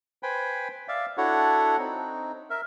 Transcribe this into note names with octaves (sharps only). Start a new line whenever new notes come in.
B4 C5 G5 G#5 B5
D5 E5 F5
D4 E4 F#4 A4 C#5 F#5
C4 D#4
A#4 E5